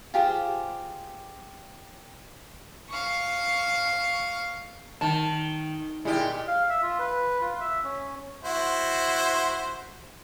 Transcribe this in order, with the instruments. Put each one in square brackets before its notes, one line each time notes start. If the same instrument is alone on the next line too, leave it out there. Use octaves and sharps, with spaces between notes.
[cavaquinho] F4 G4 G#4 C5
[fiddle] F5 C#6
[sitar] D#3 [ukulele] A5
[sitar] A#2 G4 [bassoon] G#3 [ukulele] E4
[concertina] F5
E5
F4
B4
F4
E5
C#4
[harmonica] E4 F#4 C5